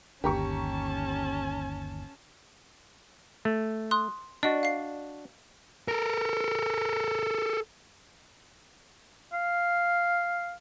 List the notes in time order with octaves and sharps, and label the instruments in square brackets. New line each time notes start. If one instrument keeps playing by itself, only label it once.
[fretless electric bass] G1 D#2 [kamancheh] C#4 A5 [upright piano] G4 A#5 C#6
[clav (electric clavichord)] A3
[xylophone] C6 D#6 F#6
[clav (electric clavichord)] D4 F#4 [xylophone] D5 D#5
[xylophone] F5 C7
[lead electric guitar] A4 A#4
[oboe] F5